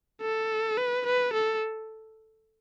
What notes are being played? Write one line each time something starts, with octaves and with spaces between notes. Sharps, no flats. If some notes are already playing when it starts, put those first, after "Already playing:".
A4
B4
B4
A4